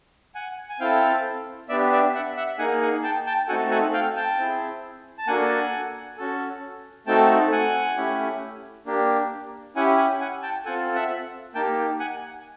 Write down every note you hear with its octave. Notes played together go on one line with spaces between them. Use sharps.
F#5 G#5
G#5
C4 E4 A4 F5 G5
B3 D4 G4 D5 E5
D5 E5
E5 F#5
E5 F#5
A#3 D#4 G#4 F#5 G#5
F#5 G#5
G5 A5
G5 A5
A3 C4 D#4 F#4 A4 F#5 G#5
F#5 G#5
F5 G5
G5 A5
C4 E4 G#4
A5
A#3 D4 F#4 A4 F#5 G#5
C#4 F#4 A4
A3 C4 D#4 F#4 A4 G5 A5
F#5 G#5
A3 C#4 E4 G4
A#3 D4 G4
C#4 E4 G4 F#5 G#5
F#5 G#5
F#5 G#5
G5 A5
C4 F4 A4 F#5 G#5
E5 F#5
A#3 D#4 G4 G5 A5
F#5 G#5